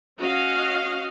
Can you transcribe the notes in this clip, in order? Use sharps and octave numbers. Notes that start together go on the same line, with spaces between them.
C#4 F#4 D#5 F5